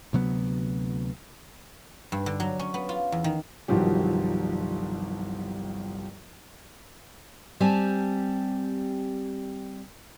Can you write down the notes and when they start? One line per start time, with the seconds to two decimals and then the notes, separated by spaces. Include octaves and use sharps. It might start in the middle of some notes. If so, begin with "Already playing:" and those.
0.13 D2 C3 F#3 B3
2.12 G2
2.26 D3
2.40 F#3
2.59 C#4
2.74 B3
2.89 F4
3.12 E2
3.24 D#3
3.68 G1 C2 D#3 F3 F#3 G4
7.60 G3 C4 G4 G#5 A5